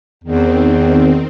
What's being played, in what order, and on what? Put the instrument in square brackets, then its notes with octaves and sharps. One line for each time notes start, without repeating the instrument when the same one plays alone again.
[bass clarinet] E2 [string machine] D#3 C4